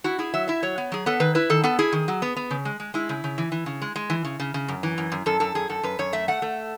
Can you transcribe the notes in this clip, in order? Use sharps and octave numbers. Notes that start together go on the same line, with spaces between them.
E4 F#4
E4 G#4
F#3 E5
E4 E5
F#3 C#5
B3
F#3 G#4
B3 A4
D#3 B4
E4 B4
D#3 A4
B3 A4
E4 G#4
D#3
F#3
B3
B3
C#3
G#3
G#3
G#3 E4
C#3
C#3
E3
E3
C#3
G#3
G#3
E3
C#3
C#3
C#3
F#2
E3
F#2
F#2
F#2 A4
F#2 A4
F#2 G#4
F#2 A4
F#2 B4
F#2 C#5
A3 E5
A3 F#5
A3